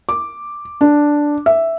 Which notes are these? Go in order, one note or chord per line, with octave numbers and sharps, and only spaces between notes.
D6
D4
E5